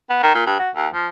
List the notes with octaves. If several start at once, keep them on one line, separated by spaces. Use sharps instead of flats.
B3
D#3
A#2
G2
F#4
D#2
F3